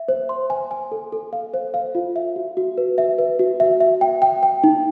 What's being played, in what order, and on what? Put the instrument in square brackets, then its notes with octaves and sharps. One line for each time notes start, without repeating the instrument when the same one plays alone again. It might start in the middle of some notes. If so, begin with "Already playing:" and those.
Already playing: [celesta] E5
C5
C6
G#5
G#5
A4
A4
F5
C5
F5
F4
E5
F#4
F#4
B4
E5
B4
F#4
E5
E5
G5
G5
G5
D#4